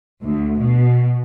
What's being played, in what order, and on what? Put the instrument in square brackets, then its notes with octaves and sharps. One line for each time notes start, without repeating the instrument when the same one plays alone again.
[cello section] D2
B2